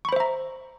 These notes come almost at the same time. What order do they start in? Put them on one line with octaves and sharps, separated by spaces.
C#6 B5 C5 E5 A#5